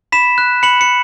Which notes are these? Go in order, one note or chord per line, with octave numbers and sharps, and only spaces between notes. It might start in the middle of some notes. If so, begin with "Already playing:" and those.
B5 B6 E7
F#6
B5 C#7 F#7
C#7